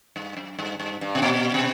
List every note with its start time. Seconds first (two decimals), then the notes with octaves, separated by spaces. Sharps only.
0.16 G2
0.37 F#2
0.59 G2
0.80 G2
1.01 G2
1.15 B2
1.22 A#2
1.54 B2